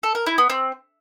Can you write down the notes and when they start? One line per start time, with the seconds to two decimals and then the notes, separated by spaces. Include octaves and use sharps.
0.03 A4
0.15 A#4
0.26 E4
0.38 B3
0.50 C4